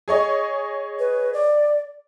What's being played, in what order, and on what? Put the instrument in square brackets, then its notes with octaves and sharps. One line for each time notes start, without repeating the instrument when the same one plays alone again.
[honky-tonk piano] G#4 C#5 D#5
[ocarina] B4
D5